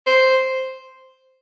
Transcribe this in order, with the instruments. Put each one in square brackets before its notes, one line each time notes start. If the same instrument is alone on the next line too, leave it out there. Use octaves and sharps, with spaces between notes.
[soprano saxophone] C5